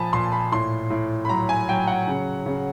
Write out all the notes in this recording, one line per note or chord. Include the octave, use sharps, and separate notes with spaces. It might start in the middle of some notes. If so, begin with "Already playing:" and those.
Already playing: A#2 F3 G#5 A5 B5
A#2 C6
B5
A2 C6
A2
B5
F#3 A#5
G#5
F#3 G5
F#5
C#3
C#3